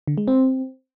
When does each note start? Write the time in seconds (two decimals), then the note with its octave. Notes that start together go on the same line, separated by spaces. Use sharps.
0.07 D3
0.18 G#3
0.28 C4